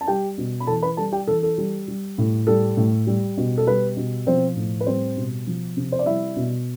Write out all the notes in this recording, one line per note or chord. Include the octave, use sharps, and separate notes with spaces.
A5
G3 G4 G5
B2
B5
E3 A4 A5
B4 B5
G3 A4 A5
G4 G5
E3 A4
A4
G3
G3
A2
G3 A4
A2
G3
B2
A4
G3 B4
B2
F3 C4 C5
A2
B4
G3 C4 C5
B2
F3
C3
C5
D5
G3 E4 E5
B2